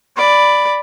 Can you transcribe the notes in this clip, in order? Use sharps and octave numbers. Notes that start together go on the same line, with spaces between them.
D5 B5